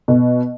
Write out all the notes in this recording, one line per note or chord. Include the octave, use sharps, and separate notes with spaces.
B2